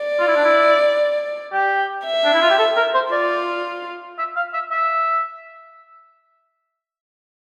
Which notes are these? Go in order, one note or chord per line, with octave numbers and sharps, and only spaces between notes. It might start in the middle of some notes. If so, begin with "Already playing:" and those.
Already playing: D5
F4
E4
D4
E4
G4
E5
D4
E4
F4
G4
A4
A#4
C5
F4 D5
E5
F5
E5
E5